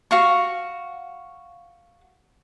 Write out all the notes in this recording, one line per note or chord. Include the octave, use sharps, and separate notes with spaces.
F#4 F5 C#6